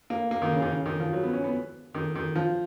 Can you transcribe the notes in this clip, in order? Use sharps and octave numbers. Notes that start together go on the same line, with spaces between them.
A#3
A#3
D#3
C#3
D#3
C#3
D#3
F3
F#3
B3
C#4
B3
D#3
D#3
F3